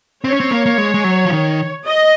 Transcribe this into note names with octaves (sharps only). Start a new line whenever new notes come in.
C4 C#5
C#4
C4
A#3
A#3
G#3
G#3
F#3
F3
D#3
D#5